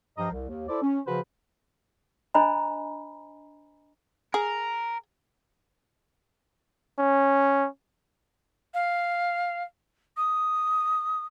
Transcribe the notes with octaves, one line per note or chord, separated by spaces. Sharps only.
G2 F3 G4 D#5 A#5 D#6
C2
D#2
E4 A4 C5 D5
C#4
C#3 F3 F#4 G#4 B4 C5
D4 C5 D#5 G#5 A#5 B5
G#4 A#4
C#4
F5
D#6